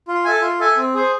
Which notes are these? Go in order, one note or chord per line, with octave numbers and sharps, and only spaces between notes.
F4
A4 E5 G#5
F4
A4 E5 G#5
C4
G#4 C5